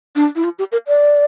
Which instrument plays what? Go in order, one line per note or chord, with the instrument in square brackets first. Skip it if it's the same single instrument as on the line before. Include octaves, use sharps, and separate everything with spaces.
[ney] D4
E4
F4
G4
A#4
D5